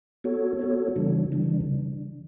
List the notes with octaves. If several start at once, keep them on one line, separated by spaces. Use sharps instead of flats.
B3 F#4 A4 C#5
B3 F#4 A4 C#5
C#3 E3 G3 D4
C#3 E3 G3 D4